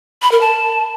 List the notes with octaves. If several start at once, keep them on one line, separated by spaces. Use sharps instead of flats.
B5
A#4
A5